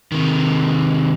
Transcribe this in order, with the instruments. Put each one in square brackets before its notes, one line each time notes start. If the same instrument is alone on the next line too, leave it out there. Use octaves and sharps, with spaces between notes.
[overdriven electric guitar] C3 D#3